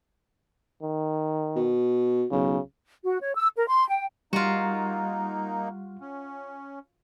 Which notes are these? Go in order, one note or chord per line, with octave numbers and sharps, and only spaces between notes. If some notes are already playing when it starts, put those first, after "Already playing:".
D#3
B2
B1 C#3
F#4
C#5
E6
A#4
C6
G5
G3 A#3 D#4 F4 F#4
C#4